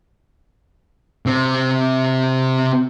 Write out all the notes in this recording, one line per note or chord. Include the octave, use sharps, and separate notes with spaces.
C3 C4